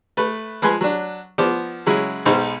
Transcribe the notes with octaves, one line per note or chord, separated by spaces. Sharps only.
A3 B4
F3 G#3 B4 G#5 C6
F#3 D4
F3 B3 C5 D5
C#3 F#3 G#3 E4
B1 B2 G#3 D#4 C5